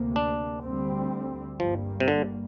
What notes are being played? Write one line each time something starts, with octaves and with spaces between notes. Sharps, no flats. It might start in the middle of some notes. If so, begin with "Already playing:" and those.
Already playing: D2 C3 A#3
D4
D2 D3 G3 C4
G1 G2 F3 G3 A#3
C3
D3